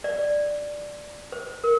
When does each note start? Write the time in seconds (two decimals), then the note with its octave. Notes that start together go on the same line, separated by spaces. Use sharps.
0.04 D5
1.32 C5
1.64 A#4